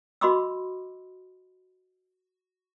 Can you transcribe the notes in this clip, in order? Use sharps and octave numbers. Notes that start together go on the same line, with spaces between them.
F#4 D#5 B5 C6 D6 E6